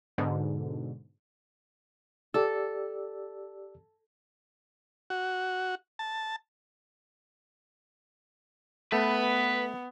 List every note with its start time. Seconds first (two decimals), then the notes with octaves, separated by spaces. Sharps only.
0.18 G#2 B2 D3
2.34 G4 A4 D5 E6
5.10 F#4
5.99 A5
8.92 A3 B3 B4